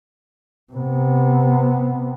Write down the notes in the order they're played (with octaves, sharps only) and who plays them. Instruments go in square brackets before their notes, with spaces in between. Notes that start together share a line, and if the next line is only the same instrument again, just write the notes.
[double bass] C3 B3